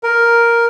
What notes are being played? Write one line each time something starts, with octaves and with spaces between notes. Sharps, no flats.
A#4